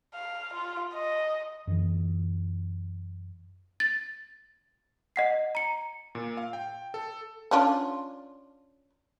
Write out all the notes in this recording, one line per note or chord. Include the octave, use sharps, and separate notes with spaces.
F5
F4
D#5
F#2 E3
A6
D#5 F#5 C7
A#5 C#7
A#2
F5
G5
A4
C#4 D4 F4